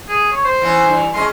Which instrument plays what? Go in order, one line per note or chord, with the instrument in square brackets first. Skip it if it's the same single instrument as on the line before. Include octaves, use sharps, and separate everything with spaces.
[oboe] G#4
C#5
C5
[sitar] E3 B3 C#4
G2 E3
[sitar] G#3 C#4 D#5 [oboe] C6